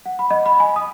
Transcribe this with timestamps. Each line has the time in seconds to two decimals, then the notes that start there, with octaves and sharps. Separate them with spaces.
0.06 F#5
0.19 B5
0.30 D#5
0.46 B5
0.60 G#5
0.76 D#6